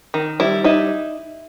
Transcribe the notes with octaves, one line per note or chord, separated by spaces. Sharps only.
D#3
G3 E4
D#4 E4